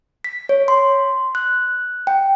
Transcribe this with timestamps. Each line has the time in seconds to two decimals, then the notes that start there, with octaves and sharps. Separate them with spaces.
0.24 B6
0.49 C#5
0.68 C6
1.35 F#6
2.07 G5